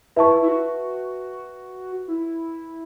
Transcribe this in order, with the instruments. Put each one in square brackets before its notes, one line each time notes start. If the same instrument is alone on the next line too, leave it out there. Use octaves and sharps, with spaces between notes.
[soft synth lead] E4 [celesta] B4 E5 A5 C#6
[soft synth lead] E4
F#4
E4